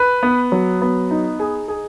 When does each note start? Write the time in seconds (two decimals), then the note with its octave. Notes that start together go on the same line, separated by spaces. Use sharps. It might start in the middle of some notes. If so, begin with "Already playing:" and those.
Already playing: B4
0.23 B3
0.52 F#3
0.82 B3
1.11 D#4
1.40 G#4
1.68 G#4